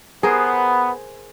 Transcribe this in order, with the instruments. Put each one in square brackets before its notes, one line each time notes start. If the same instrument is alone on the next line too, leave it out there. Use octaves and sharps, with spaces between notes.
[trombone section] B3 [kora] G#4 A#4 C5